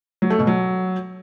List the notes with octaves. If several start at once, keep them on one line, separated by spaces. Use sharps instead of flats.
F#3
A3
B2
F#3